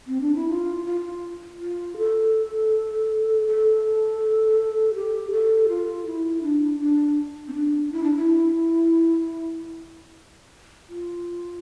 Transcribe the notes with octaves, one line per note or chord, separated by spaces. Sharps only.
C4
D4
E4
F4
F4
F4
A4
A4
G4
A4
F4
E4
D4
D4
C4
D4
E4
D4
E4
F4